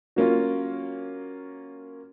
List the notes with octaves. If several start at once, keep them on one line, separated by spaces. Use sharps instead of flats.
F#3 A#3 C#4 F4